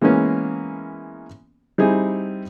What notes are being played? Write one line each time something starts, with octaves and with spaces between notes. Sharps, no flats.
E3 G#3 A#3 B3 C#4
G3 C4 D#4 E4 G#4